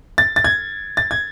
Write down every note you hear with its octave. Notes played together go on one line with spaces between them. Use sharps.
A6
A6
G#6
A6
G#6